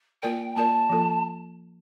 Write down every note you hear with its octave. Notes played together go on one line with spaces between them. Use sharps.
A#3 F4 A#4 D5 G5
A#3 F4 A#4 D5 A5
F3 A#3 F4 A4